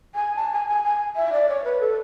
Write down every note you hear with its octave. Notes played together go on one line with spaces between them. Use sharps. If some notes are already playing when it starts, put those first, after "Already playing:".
G#5
A5
G#5
G#5
G#5
E5
D5
C#5
B4
A4